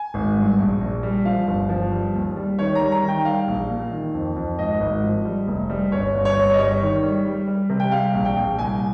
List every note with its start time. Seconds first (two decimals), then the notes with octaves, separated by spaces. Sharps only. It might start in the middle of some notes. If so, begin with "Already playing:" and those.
Already playing: G#5
0.14 G#1
0.36 G2
0.58 A#1
0.81 A#1
1.03 G3
1.25 F3 F5
1.47 G1
1.69 F3
1.92 G3
2.14 D#2
2.36 G3
2.59 D#3 C#5
2.75 A#5
2.81 G3
2.92 A#5
3.03 D#3
3.08 G5
3.25 G3 F5
3.48 A#1
3.70 A#2
3.92 D#3
4.14 F2
4.36 F2
4.59 G#1 D#5
4.80 G#1
5.03 F3
5.25 G3
5.47 F1
5.70 G3
5.92 G1 C#5
6.14 G1
6.25 C#5
6.37 G1
6.52 D#5
6.58 G3 C#5
6.80 D#3
7.03 G3
7.25 G3
7.48 G3
7.70 C3
7.80 G5
7.92 G3 F5
8.14 A#1
8.25 G5
8.36 A#1
8.59 C2 G#5